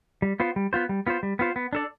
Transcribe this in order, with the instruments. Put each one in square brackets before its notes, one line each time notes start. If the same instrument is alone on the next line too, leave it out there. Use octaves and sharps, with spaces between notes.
[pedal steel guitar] G3
B3 F4 C5
G3
B3 F4 C5
G3
B3 F4 C5
G3
B3 F4 C5
B3
D4 A4 D5